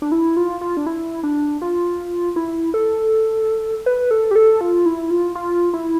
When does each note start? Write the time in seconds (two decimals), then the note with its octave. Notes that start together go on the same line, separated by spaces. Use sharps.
0.02 D4
0.12 E4
0.37 F4
0.61 F4
0.77 D4
0.87 E4
1.23 D4
1.62 F4
2.36 E4
2.74 A4
3.86 B4
4.11 A4
4.31 G4
4.36 A4
4.61 F4
4.86 E4
5.11 F4
5.35 F4
5.73 E4